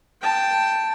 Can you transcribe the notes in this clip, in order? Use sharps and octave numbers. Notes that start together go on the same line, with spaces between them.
G5 A5